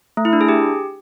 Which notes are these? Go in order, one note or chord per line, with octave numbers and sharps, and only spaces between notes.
A3
E4
D4
G#4
G4